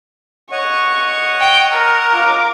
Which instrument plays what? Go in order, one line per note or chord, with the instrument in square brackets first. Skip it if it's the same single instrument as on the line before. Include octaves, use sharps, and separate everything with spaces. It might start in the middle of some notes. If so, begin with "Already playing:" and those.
[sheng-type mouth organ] C#5 D#5 F#5 [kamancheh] C#6
[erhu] G5
A#4
[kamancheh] F4 D6